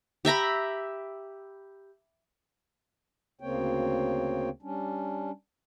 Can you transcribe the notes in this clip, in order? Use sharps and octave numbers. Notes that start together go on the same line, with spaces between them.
G4 E5 A#5 B5
D2 C#3 A#3 C4 C#5 G5
G3 C#4 D4